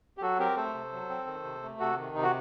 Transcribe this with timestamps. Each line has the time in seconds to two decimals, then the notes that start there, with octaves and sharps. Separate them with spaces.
0.18 G4
0.22 F#3 F#4 A4
0.39 C4 G4 A#4
0.56 A3 A4 C5
0.74 C3
0.92 F#3
1.09 C4
1.27 D#3
1.44 C3
1.62 A3
1.79 C3 F#4 A4
1.98 D#3
2.15 C3 D#4
2.23 F#4